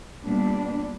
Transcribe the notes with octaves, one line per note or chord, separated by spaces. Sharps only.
A#2 G3 B3 D4